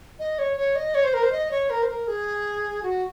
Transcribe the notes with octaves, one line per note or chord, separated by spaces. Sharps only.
D#5
C#5
C#5
D#5
C#5
C5
A#4
C5
D#5
C#5
A#4
C5
A#4
G#4
F#4